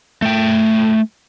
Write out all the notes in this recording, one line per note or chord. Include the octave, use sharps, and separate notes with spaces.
A3 G5